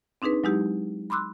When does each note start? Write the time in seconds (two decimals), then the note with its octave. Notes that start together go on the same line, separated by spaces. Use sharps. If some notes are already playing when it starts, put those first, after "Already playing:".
0.22 C4 D4 D#4 G#4 B4
0.44 F#3 G#3 D#4 E4 G4
1.10 B5 C6 D6 E6 F#6